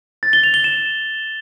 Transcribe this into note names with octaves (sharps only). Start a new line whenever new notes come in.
A6
G7
F7
G7
E7